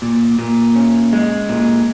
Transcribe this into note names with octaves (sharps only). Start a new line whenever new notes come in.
A#2
A#2
C#4
G#3
A#2